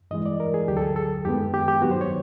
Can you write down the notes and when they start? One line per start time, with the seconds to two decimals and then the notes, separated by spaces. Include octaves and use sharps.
0.11 G2 E3 G#3 D#5
0.26 D5
0.40 A#4
0.54 G#4
0.68 D2 D3 F#3 G4
0.77 A4
0.82 G#4
0.96 A4
1.25 F#2 D#3 G#3 B3 G4
1.54 G4
1.68 G4
1.82 G2 D#3 F#3 B3 F#4
1.91 C5
2.01 C#5